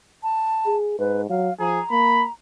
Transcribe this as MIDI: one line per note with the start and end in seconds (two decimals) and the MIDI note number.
0.23 0.76 81
0.66 0.94 68
0.99 1.29 44
0.99 1.22 71
1.30 1.49 54
1.30 1.54 77
1.60 1.79 53
1.60 1.81 68
1.60 2.32 82
1.91 2.26 58
1.91 2.22 83